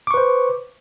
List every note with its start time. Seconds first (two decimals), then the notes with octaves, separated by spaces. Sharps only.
0.07 D6
0.11 C#6
0.14 B4
0.17 C5